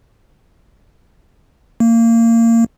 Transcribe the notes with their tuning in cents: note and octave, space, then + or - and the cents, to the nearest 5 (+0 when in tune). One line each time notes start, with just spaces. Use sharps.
A#3 -25